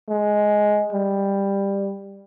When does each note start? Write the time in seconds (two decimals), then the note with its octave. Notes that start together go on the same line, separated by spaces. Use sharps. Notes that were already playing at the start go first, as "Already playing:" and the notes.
0.09 G#3
0.93 G3